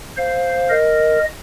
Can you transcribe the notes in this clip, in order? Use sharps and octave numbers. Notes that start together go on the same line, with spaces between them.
C5 F5
A#4 D#5